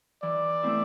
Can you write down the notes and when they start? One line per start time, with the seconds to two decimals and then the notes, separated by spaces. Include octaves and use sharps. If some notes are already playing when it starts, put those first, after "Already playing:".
0.23 E3 D5
0.63 A3 C4 E4